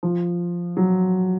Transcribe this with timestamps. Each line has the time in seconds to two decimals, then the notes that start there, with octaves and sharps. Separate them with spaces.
0.03 F3
0.77 F#3